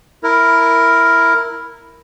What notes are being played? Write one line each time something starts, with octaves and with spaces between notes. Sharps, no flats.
E4 A#4